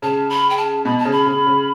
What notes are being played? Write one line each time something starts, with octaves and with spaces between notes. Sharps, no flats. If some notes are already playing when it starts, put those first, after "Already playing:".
C#3 A5
B5
G5
A5
B2 B5
A5
C#3
B5
C#3
C#3